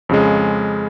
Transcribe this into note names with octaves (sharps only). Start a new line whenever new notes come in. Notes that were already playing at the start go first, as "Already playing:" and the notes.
F2 C#3 G#3